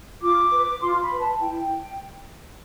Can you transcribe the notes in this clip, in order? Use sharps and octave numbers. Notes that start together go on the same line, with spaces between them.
F4 D6
B4
F4 C6
B5
B4
A5
E4 G5